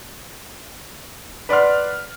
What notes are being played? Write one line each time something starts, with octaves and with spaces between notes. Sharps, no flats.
B4 D5 F#5 C6 F6